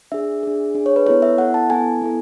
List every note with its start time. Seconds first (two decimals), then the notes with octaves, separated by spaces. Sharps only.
0.12 D4 G#4 E5
0.43 D4 G#4
0.75 D4 G#4
0.86 C#5
0.96 B4
1.07 B3 E4 A4 C#5
1.22 E5
1.38 B3 E4 A4 F#5
1.54 A5
1.70 B3 E4 A4 G#5
2.02 B3 E4 A4